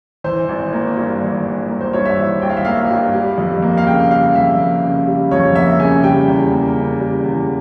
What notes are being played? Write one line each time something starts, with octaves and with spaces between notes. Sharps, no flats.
E3 C5
G#1
A#3
G2
E3
G#1
A#3
C5
G2 C#5
E5
E3
G#1 G5
F5
E5
A#3 F5
G2
G3
F2
A#3
F5
C#3 G5
G3 F5
F2 E5
A#3
C#3
G3
F2 C#5
A#3 E5
C#3 G#5
G3 G5
E2
A#3
C#3
G3
E2